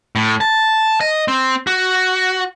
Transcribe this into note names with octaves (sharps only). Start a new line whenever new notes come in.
A2
A5
D#5
C4
F#4